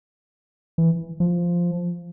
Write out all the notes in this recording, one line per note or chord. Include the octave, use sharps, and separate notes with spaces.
E3
F3